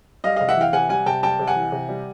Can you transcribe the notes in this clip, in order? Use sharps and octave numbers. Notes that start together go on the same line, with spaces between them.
G3 D#5 F5
C3 D#5 F5
E5 F#5
E3 F5 G5
C3 F#5 G#5
G3 F#5 G#5
C3 G5 A5
G3 G5 A5
C3
F#5 G#5
E3
C3
G3